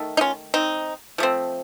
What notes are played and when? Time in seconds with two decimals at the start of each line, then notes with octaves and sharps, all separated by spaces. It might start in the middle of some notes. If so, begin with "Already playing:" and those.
Already playing: D#3 A3
0.17 D#4
0.21 C#4 F4
0.54 C4 D#4
1.18 F3 A3 C4